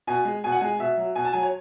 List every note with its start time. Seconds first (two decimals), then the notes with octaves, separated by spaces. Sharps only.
0.07 B2 G#5
0.25 G#3
0.44 B2 G#5
0.52 F#5
0.60 G#3 G#5
0.79 B2 E5
0.97 F#3
1.15 B2 G#5
1.25 A5
1.33 F#3 G#5
1.43 C#5